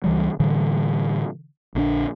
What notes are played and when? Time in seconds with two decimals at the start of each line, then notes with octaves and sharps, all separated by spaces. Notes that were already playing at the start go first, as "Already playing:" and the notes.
0.04 C#2 E3 G3
0.40 A2 D3 E3 G3
1.75 A#1 D3 C4 D4